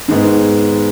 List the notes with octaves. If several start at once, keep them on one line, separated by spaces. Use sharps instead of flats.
G#2 D#3 G#3 B3